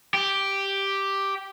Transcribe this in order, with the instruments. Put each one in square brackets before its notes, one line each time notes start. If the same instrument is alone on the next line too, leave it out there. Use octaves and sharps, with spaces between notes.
[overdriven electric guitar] G4